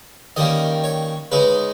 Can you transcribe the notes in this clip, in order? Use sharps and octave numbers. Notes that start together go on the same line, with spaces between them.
D#3 G3 A#3 C#4 D#5
C#5
C#3 G#3 D#4 B4